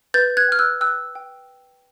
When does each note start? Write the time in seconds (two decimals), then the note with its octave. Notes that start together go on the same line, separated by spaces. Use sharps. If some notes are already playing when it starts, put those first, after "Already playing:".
0.14 B4 G6 A6
0.37 F#6 G#6
0.48 G5 F6
0.59 E6 F#6
0.81 G5 E6 F#6
1.15 G5